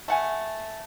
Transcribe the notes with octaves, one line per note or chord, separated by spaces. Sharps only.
A3 F#5 G#5